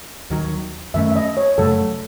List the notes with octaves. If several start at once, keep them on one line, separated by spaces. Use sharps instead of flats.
D#2 D#3 F#3
F#2 D#3 A3 C#4 E5
E5
D#5
C#5
F#2 C#3 F#3 A3 A4